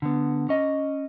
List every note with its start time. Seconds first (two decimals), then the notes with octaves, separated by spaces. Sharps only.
0.02 D3 B3
0.49 C#4 D#5